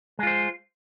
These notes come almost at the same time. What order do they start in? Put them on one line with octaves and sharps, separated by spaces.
G#3 F4 C5